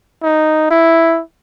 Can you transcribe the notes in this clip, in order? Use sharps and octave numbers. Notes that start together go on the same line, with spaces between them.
D#4
E4